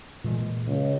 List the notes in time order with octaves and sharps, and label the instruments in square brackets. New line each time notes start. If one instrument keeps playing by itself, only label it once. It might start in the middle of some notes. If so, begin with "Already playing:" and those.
[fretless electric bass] A#2 E3 G#3
[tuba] C#2